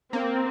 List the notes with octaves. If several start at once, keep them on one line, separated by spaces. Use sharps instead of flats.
A#3 C4